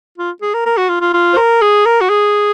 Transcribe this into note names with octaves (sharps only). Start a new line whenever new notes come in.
F4
G#4
A#4
A#4
F#4
F4
F4
F4
C5
A#4
G#4
A#4
F#4
G#4